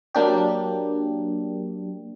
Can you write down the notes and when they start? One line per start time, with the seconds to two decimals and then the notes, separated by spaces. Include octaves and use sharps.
0.15 F#3 A#3 D4 G4